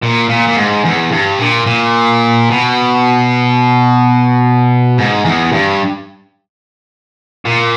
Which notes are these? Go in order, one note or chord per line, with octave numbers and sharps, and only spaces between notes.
A#2
A#2
A#2
G#2
E2
G2
A#2
A#2
B2
G#2
E2
G2
A#2